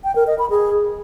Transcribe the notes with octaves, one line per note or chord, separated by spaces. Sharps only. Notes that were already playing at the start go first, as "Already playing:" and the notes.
G5
A#4
D#5
B5
G#4